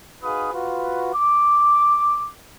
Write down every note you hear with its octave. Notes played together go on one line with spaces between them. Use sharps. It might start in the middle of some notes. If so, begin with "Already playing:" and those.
D#4 F#4 G#4 B4 F5 D#6
F4 F#4 B4
D6